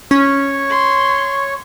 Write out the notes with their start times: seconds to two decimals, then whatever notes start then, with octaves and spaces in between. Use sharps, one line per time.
0.11 C#4 C#5 C#6
0.70 C6